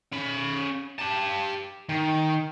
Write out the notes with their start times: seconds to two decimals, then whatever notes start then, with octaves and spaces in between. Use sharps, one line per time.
0.13 C#4 B5
0.99 G4 A5
1.89 D#3